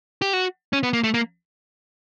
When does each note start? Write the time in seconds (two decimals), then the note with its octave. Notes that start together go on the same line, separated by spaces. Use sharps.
0.22 G4
0.33 F#4
0.73 C#4
0.83 B3
0.93 A#3
1.04 A3
1.14 A#3